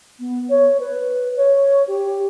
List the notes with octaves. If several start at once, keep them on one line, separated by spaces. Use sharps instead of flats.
B3
C#5
B4
C#5
G4